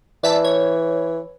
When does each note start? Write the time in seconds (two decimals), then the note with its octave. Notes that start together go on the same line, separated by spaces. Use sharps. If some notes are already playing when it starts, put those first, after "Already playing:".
0.23 E3 D5 E5 A5
0.44 C#5